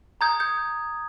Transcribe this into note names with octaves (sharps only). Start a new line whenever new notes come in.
A#5 D#6 G6 G#6
G6